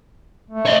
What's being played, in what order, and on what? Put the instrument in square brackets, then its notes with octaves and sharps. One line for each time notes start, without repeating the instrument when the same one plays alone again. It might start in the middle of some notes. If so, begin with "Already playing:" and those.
[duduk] A3
[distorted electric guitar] C#5 D#5